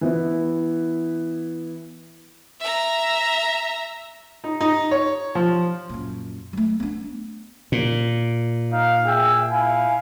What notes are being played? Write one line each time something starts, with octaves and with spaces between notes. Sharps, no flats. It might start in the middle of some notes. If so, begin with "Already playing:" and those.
E3 B3 E4
E5 A#5
D#4
D#4
C#5
F3
F#2 A#2
F#3 A3
B3 D4
A#2
D#4 F5
G#4 E5 G5
E4 F5 G#5